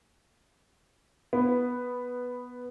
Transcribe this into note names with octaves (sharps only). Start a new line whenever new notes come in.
B3